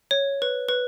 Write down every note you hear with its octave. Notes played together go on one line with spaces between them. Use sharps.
C#5
B4
B4